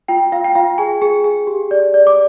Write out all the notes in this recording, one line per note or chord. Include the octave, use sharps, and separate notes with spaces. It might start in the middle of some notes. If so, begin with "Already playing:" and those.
F4 G5
F4 F5
G5
F4 F5
G#4 G#5
G#4
G#4
G4
D5
D5
D6